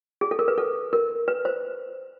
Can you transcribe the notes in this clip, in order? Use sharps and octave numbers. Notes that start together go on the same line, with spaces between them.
G#4
A4
A#4
B4
A4
A#4
B4
C5